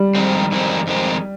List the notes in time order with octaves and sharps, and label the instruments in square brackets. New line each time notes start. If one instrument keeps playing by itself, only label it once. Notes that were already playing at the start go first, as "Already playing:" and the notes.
Already playing: [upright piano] G3
[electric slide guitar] F2 D#3 G#3 C4
F2 D#3 G#3 C4
F2 D#3 G#3 C4